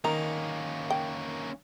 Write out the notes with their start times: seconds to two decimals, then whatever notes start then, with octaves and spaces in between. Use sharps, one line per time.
0.05 D#3 A#3 C#4 A#5
0.90 G5